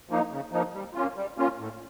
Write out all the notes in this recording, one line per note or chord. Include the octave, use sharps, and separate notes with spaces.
F3 A#3 D#4
C#3
F3 A#3 D#4
G3
A#3 C#4 F4
G3
A#3 C#4 F4
A2